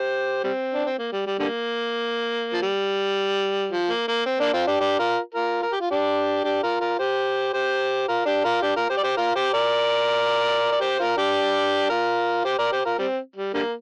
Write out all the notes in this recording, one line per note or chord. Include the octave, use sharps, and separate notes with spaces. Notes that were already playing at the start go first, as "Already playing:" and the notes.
Already playing: G4 C5
G3 C4
D4
C4
A#3
G3
G3
D3 G3 A#3
F3
G3
F3
A#3
A#3
C4
A#3 D4
C4 F4
D4 G4
D4 G4
F4 A#4
F4 A#4
A#4
G4
F4
D4 G4
D4 G4
F4 A#4
F4 A#4
G4 C5
G4 C5
F4 A#4
D4 G4
F4 A#4
D4 G4
F4 A#4
G4 C5
D5
G4 C5
F4 A#4
G4 C5
A#4 D5
D5
G4 C5
F4 A#4
D4 G4
F4 A#4
G4 C5
A#4 D5
G4 C5
F4 A#4
G3 C4
G3
D3 G3 A#3